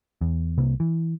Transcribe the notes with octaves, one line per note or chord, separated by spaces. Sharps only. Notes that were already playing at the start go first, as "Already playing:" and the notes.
E2
C2 C3 A#3
E3